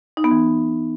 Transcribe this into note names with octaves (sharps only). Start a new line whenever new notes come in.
D#4
B3
E3